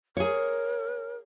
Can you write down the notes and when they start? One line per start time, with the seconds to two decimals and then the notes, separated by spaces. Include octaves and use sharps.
0.17 G#4 A#4 C#5